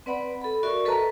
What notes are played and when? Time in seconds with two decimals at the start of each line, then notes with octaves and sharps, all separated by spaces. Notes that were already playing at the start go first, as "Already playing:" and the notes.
0.06 C4 B4 D5 F#5 B5
0.41 A4 B5
0.63 F#4 A#4 D5 E5 C#6
0.85 A4 B4 D#5 A5 A#5